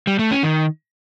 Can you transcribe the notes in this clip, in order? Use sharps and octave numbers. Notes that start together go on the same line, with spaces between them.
G3
A3
C#4
D#3